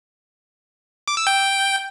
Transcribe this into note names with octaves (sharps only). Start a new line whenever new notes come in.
D6
E6
G5